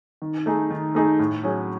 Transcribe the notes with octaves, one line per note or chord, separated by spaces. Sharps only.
D#3
A3 D#4 G#4
D#3
A3 D#4 G#4
A2
F#3 C#4 G#4